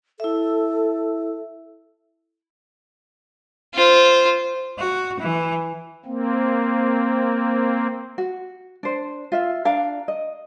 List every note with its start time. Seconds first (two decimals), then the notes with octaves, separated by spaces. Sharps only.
0.20 E4 A4 E5
3.74 F4 C5
4.78 F#4
5.20 E3
6.05 A#3 C4
8.18 F#4
8.83 D4 C5
9.32 F4 E5 F5
9.65 D4 F5 A#5
10.08 D#5